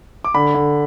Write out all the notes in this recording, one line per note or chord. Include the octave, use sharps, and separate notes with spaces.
D6
D3 B5
D3